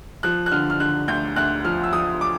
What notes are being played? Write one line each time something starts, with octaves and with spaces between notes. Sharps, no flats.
F3 F#6
F#6
D3 F6
F6
D3 F#6
D2 G6
D2 F#6
F3 F6
E6
F3 D#6
D6